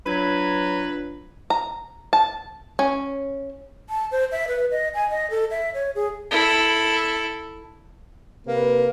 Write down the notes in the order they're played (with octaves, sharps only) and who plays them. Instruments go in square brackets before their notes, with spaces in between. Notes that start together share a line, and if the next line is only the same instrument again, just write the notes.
[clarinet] F#3 [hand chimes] D4 F4 G#6 [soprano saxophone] B4
[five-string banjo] A#5
A5
C#4
[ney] A5
C5
E5
B4
D#5
G#5
D#5
A4
E5
C#5
G#4
[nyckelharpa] E4 A4
[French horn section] C3 B4 [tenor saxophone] A#3